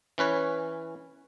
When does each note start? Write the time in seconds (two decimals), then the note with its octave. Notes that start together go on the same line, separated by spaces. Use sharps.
0.18 E3 C#4 B4 C#5